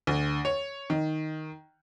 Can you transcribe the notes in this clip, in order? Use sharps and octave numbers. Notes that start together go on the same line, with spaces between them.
D2
C#5
D#3